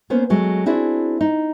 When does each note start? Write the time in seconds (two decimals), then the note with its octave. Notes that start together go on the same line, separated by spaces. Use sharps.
0.10 A#3 B3 C#4 C5
0.30 F#3 G#3 A3
0.66 C4 D4 E4 F#4 G#4
1.21 D#4